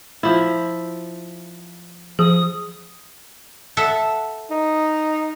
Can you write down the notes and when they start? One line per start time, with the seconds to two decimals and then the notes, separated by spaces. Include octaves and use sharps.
0.23 F3 E4
2.19 F3 G#4 D#6
3.77 A4 E5 F#5
4.51 D#4